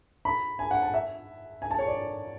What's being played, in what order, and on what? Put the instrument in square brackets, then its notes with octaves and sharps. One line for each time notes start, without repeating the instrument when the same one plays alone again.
[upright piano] B5
G#5
F#5
A5
E5
G#5
A5
C#5
D5